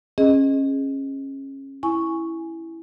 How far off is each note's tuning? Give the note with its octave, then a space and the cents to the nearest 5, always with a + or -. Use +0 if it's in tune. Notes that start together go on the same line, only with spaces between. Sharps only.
C#4 -25 G#4 +0 D#5 +0
E4 +0 G#5 +0 C#6 +0